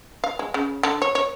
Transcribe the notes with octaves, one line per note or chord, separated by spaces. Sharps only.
F5
G#3
C#3
D3
C#5
C#5